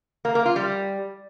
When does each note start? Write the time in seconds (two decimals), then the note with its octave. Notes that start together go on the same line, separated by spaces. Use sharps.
0.25 A#3
0.35 A#3
0.45 F4
0.56 G3